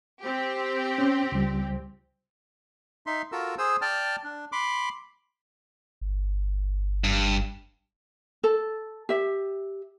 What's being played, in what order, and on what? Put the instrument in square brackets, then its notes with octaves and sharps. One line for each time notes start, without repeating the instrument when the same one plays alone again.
[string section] C4 G4
[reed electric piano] C#4
C#2 G3
[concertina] D#4 E5 C6
F4 F#4 A4 A#4 E6
G#4 C5 D#6 E6
D5 G5 A5 F6
D4
B5 C6 D6
[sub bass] G1
[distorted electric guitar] G2
[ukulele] A4
G4 E5